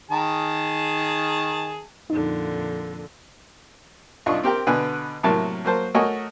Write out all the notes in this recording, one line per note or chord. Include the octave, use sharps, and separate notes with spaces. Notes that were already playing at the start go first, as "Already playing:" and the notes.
D#3 G#4 A5
F2 A#2 D3 D#4
C2 D4 D#4 F4 C#6
C4 G4 A#4 G5
B2 D3 B4 G#5
A2 C3 F#3 A#3 A#4 A5
F#3 A#3 C5 A5
A3 F#4 A#4 C#5 D#5 G#5